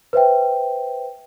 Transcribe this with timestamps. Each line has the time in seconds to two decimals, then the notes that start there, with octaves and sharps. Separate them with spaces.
0.13 B4 C5 E5 G5